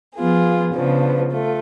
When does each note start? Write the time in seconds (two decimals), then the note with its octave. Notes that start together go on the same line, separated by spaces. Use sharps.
0.17 F3 B3 F4 G#4
0.74 C#3 F3 B3 D4
1.30 A3 F4